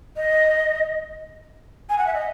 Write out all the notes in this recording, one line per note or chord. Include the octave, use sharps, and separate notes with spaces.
D#5
G#5
F#5
E5
D#5